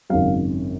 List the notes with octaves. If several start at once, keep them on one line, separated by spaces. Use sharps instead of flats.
G#1 F#2 C#3 F#3 F5